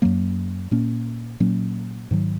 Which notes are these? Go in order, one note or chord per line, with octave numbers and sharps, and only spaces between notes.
F#2 F#3 A#3
A#2 A#3 C#4
A#2 F#3 A#3 C#4
G#2 D#3 F#3